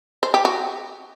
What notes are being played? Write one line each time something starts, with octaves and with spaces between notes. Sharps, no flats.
C5
G4
F#4